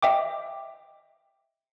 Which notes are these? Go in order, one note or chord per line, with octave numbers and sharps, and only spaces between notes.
D#5 E5 G5 D6